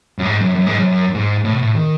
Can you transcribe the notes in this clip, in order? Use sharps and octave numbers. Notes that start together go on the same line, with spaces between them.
F#2
G#2
F#2
F#2
G#2
F#2
G#2
A2
B2
A2
D#3